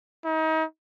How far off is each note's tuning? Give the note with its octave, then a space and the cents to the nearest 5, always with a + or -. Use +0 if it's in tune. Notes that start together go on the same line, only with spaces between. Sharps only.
D#4 +35